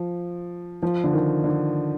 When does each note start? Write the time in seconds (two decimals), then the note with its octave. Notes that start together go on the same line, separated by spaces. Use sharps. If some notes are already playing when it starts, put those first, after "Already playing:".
Already playing: F3
0.82 F3
1.04 D3
1.13 D#3
1.44 D3